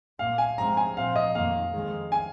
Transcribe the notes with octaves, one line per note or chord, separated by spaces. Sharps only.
A#2 A#3 F5
G#5
G#2 F3 G#3 C4 A#5
G#5
A#2 F3 C4 F5
D#5
F2 D#3 A#3 F5
F2 D#3 G#3
G#5